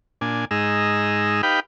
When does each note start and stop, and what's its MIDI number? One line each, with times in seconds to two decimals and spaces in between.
0.21 0.45 46
0.21 0.45 62
0.21 0.45 80
0.51 1.42 44
0.51 1.42 63
0.51 1.42 68
0.51 1.42 82
0.51 1.42 88
1.43 1.60 63
1.43 1.60 67
1.43 1.60 71
1.43 1.60 77
1.43 1.60 79
1.43 1.60 83